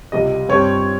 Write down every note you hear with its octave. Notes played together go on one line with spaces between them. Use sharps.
C#2 C3 G3 D#5
G2 G3 C4 C#5